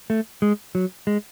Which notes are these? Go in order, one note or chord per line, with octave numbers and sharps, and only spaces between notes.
A3
G#3
F#3
G#3